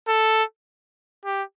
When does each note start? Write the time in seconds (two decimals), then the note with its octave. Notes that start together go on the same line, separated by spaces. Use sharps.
0.08 A4
1.25 G4